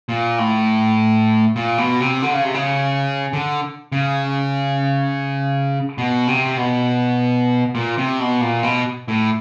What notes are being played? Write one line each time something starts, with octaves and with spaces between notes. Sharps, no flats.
A#2
A2
A#2
B2
C3
D3
C#3
C3
C#3
D3
C#3
B2
C3
B2
A#2
C3
B2
A#2
B2
A2